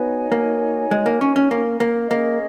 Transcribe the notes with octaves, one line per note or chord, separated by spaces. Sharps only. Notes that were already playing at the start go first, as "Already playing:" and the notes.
Already playing: B3 D#4 F#4 C#5 G#5
A#3
G#3
A#3
C#4
C#4
A#3
A#3
A#3 C#4 G#4 D#5